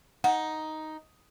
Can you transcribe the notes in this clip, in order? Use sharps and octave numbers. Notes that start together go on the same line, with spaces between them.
D#4 F#5